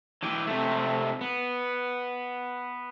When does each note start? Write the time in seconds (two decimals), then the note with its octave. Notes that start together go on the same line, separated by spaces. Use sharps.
0.23 E3 G4
0.47 C3 A3
1.21 B3